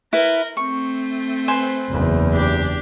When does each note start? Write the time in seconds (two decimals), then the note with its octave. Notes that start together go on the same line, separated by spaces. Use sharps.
0.13 E4 A#4 B4
0.57 A3 C4 C#6
1.48 B4 C5 G#5
1.89 F#1 E2
2.32 D4 G4